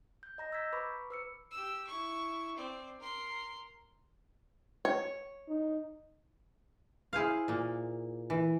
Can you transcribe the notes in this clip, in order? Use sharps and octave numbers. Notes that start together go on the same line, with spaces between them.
G6
D#5 A#5 A#6
E6 G6 G#6 B6
B4 A#5 B5 C#6 D6
B4 E6 C#7
G4 E6
E4 C#6
C4 D5
A#4 C6
C#5
D#4
E4 G#4 C5 F5
A#2 A#3
E3